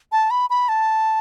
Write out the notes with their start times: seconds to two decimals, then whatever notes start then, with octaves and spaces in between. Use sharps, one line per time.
0.12 A5
0.31 B5
0.50 B5
0.69 A5